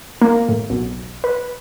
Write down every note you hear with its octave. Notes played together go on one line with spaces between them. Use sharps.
A#3
A2
B1
B4